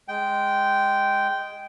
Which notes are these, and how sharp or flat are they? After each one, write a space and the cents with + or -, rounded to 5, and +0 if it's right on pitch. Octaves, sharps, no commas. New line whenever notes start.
G#3 +0 G5 -10